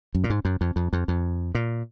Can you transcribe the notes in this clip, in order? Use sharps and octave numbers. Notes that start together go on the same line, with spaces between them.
F#2
A#2
G#2
F#2
F2
F2
F2
F2
A#2